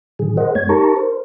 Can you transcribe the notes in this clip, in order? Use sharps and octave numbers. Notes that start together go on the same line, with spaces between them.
A2 D3 D#3 F#3 G#4
G#4 A#4 C5 D#5 F#5
F#2 G#3 A#3 C#5 G#6
D#4 G4 A#4 A5 A#5 C#6
A#4 C5